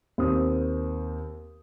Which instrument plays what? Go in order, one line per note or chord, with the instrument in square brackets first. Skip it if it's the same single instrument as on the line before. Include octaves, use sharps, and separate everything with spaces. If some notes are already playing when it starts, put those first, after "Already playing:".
[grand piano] D#2 C4 D#6